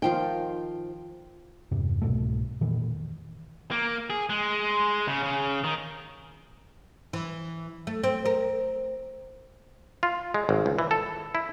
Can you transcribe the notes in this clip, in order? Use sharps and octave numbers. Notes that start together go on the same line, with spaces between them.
D#3 F3 F4 G5
E2 G2 C3
C2 G#2 B2 A3
F2 A#2 D#3 E3
A#3
G#4
G#3
C#3
C#3
D#3
E3
A3
C4
A#4
F4
G#3
G#1
C#2
E3
A4
E4